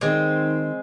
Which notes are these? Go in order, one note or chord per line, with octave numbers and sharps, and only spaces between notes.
D#3 G#3 C4